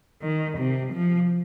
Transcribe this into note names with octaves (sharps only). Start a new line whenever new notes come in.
D#3
C3
F3